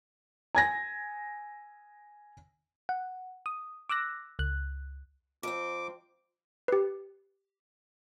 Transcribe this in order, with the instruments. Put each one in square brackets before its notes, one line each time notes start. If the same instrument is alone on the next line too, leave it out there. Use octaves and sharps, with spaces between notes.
[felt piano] G#5 G#6 A#6
[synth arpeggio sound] F#5
D#6
D6 E6 F#6 A#6
C#2 F#6
[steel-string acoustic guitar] F2 C4 [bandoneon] D6
[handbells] G4 B4